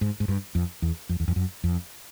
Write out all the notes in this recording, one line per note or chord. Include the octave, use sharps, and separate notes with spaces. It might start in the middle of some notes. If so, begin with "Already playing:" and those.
G#2
G#2
G2
F2
E2
F2
E2
F2
F#2
F2